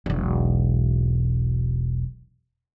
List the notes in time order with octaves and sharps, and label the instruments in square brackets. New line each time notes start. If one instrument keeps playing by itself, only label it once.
[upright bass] E1 B1